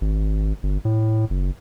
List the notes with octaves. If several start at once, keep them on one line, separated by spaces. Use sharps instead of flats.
G#1
G1
A2
F#1